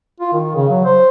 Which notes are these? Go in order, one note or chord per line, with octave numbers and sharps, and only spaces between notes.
F4
D#3
C#3
F#3
C5